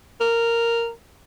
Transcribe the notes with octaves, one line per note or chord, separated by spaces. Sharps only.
A#4